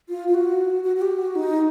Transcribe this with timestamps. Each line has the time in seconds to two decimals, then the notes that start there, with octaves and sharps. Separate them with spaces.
0.09 F4
0.29 F4
0.34 F#4
0.84 F#4
0.96 F#4
1.01 G4
1.19 F#4
1.36 D#4